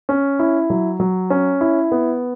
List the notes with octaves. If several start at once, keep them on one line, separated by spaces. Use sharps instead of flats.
C#4
E4
F#3
F#3
C#4
E4
B3